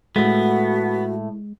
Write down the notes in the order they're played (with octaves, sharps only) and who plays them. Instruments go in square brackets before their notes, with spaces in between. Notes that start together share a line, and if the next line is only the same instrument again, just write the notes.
[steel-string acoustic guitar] A2 A3 [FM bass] G#3 [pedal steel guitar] B3 [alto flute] F#4